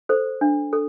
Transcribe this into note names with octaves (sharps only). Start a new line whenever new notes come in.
A4 C5
D4
A4